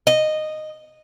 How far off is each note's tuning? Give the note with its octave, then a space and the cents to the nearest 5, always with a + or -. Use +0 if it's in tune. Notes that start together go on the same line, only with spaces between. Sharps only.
D#5 -10